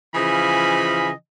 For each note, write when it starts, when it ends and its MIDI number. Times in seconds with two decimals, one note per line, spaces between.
0.14 1.09 49
0.14 1.09 52
0.14 1.09 53
0.14 1.09 75
0.14 1.09 80
0.14 1.09 83